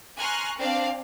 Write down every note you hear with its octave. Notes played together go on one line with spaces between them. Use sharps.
G#5 A#5 C6 C#6 F6 F#6
C4 D4 D5 F5